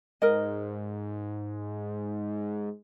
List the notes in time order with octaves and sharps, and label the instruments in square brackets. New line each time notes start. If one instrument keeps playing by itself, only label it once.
[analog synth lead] G#2 [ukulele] A#4 D#5